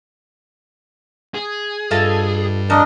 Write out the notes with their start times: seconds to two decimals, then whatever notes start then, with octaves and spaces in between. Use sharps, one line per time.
1.34 G#4
1.91 G2 F4 A4 D#5
2.70 F2 D4 A#4 D#5